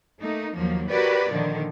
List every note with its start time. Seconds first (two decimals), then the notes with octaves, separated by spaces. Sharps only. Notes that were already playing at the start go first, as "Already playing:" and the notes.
0.19 A3 A#3 D#4
0.52 D#2 F3 F#3 A#3
0.89 F#4 G4 A#4 B4 C#5 D5
1.31 A#2 D3 D#3 F3